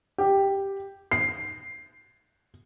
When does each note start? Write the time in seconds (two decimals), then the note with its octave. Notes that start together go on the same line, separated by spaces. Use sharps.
0.18 G4
1.11 C7